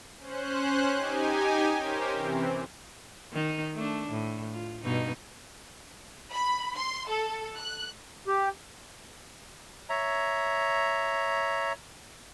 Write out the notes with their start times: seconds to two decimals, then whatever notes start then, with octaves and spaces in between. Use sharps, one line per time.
0.19 C#4 C5 F#6
0.92 D#4 G4 G#5
1.78 C#4 G4 A#4 C5
2.13 C3 E3 C4
3.33 D#3 D#4
3.74 A3 D4
4.11 A2
4.53 F4
4.84 G2 B2 D#4
6.32 B5
6.76 C6
7.08 A4
7.58 F#6
8.28 G4
9.89 C#5 E5 A#5